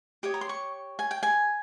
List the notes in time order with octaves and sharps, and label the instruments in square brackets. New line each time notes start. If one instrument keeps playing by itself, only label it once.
[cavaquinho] G4 C#5 D#6
A#5
C6
C#6
G#5
G5
G#5